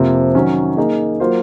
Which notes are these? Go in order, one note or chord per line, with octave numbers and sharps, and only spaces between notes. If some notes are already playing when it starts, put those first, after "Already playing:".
Already playing: F2 C3 F3 A#3
D#3 F#3 C#4
A#3 D#4 G#4
F#3 A#3 F4 C5